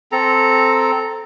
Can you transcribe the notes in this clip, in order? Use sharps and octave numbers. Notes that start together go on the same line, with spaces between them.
C4 A4 A#5